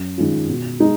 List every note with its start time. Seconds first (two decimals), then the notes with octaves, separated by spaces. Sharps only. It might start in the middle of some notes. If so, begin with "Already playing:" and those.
Already playing: F#2
0.18 D#3 G#3 C#4 F4
0.49 B2
0.80 G#3 D#4